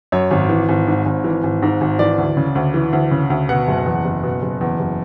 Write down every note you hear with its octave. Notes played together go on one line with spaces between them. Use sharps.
F#2 C#5
G#1
E3
G#1
G#2
G#1
E3
G#1
G#2
G#1
E3 D5
D2
C#3
D2
E3
D2
C#3
D2
B2 F#5
F#1
E2
F#1
B2
F#1
E2
F#1